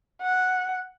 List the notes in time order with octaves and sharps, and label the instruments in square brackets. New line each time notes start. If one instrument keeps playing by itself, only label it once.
[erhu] F#5